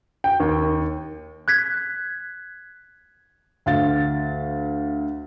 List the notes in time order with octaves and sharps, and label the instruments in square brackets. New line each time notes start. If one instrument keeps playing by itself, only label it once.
[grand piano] G5
D#2
[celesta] F#6 G#6 B6
[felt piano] D2 F5 A6